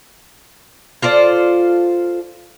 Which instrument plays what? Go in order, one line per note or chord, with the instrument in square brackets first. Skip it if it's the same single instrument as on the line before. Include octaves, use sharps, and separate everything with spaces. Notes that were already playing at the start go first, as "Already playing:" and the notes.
[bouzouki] F4 A4 C5 D5